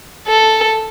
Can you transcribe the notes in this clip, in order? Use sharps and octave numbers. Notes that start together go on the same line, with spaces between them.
A4